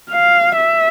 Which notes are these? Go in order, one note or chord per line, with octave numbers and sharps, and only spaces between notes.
F5
E5